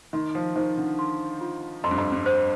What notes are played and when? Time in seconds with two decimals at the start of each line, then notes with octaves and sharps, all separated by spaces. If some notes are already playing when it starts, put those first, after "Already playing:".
0.13 D#3 C6
0.35 F3
0.56 D#3 C5
0.77 D3
0.99 C6
1.41 F4
1.84 F2 C6
1.91 G2
1.98 F2
2.12 G2
2.26 C5